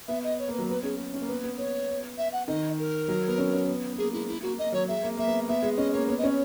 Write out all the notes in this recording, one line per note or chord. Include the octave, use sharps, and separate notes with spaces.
B3 E5
D#5
C#5
A#3
B4
F#3
B3 B4
C#4 G#4
B3
C#4
A#3
B3 B4
B3
B3 C#5
E5
F#5
D#3 D#5
A#4
F#3
B3
C#4
C#4
B3
B3
A#3 G#4
G#3 E4
E4
A#3 F#4
A#3 D#5
F#3 C#5
G#3 E5
A#3
A#3 E5
B3
B3 E5
G#3
C#4 D#5
A#3 C#5
B3 C#5
D#5
C#4 C#5